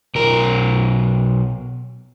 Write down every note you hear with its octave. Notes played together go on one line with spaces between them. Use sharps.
B1 A#4